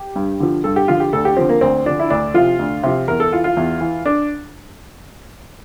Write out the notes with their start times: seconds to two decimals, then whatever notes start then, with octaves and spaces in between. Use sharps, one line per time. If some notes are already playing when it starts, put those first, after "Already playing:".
Already playing: G4
0.16 G2
0.40 D3 F3
0.64 G2 A4
0.76 G4
0.88 D3 F3 F4
1.00 G4
1.13 D2 A4
1.25 G4
1.37 D3 F3 C4
1.49 A#3
1.61 D2 C4
1.86 D3 F3 D4
1.99 E4
2.10 D2 D4
2.34 C3 F3 F4
2.59 D2
2.83 C3 F3
3.08 E2 A#4
3.20 A4
3.32 E3 F4
3.44 F4
3.57 E2
3.81 E3
4.06 D4